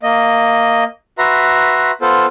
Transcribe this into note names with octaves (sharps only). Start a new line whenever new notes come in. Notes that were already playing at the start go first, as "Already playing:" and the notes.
A#3 D#5
F#4 B4 E5 A#5 C6
B3 F4 A4 C5